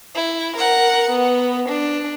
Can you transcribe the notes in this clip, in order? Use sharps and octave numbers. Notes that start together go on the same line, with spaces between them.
E4
A#4 F#5
B3
D4